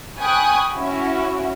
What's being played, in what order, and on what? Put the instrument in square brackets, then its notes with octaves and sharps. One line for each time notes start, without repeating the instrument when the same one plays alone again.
[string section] G5 G#5 B5 C#6 D#6 F#6
C#4 E4 F#4